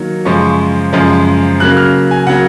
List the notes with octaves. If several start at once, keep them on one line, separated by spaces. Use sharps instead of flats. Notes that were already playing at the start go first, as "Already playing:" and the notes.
Already playing: D#3 F#3 A#3
F#2 C#3 F3 G#3 C#6
F#2 C#3 F3 G#3
C#3 F#3 A#3 F#6
F6
G#5
C#3 F#3 A#3 F#5